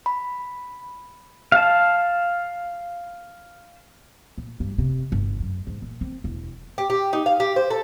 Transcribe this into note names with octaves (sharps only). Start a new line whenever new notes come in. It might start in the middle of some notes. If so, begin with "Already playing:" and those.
B5
F5 A5
A#2
G2
C3
G1
F#2
G#2
A#2
C4
E1
G4
G4
D#4
F5
G4
C5
A4